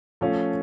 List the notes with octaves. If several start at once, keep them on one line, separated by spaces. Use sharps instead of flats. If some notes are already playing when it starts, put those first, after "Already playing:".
F3 A3 C#4 F4